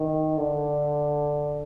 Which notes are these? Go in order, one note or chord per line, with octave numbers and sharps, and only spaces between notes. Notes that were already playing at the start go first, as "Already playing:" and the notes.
Already playing: D#3
D3